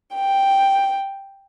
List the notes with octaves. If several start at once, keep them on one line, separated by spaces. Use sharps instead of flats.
G5